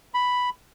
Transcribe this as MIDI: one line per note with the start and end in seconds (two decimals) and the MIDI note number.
0.14 0.50 83